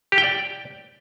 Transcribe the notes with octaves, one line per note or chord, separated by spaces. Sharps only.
G4
G5
D5